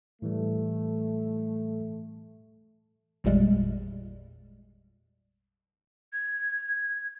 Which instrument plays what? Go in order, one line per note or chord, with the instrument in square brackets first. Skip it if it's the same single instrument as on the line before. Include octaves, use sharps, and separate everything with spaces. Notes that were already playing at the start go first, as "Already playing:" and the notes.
[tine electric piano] A2 E3 G3 [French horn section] A3
[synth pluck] G#1 E2 A#2 G3 G#3
[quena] G#6